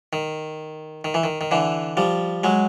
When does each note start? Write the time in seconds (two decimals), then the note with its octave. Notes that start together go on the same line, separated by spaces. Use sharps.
0.13 D#3
1.04 D#3
1.14 E3
1.24 D#3
1.41 D#3
1.51 D3 E3
1.97 F3 G3
2.44 F#3 G#3